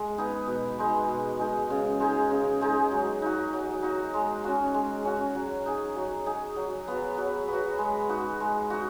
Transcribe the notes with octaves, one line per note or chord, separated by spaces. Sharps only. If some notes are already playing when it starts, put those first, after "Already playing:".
Already playing: G#3
B3 D#4 G#4
B2
G#3 D#4
B2
G#3 D#4
C#3
G#3 D#4 G#4
C#3
G#3 D#4 G#4
F#3
D#4 F#4
F#3
D#4 F#4
G#3
C#4 F#4
G#3
C#4 F#4
F#3
D#4 G#4
F#3
D#4 G#4
F#3
B3 F#4
F#3
B3 F#4
G#3
D#4 F#4
G#3
D#4 F#4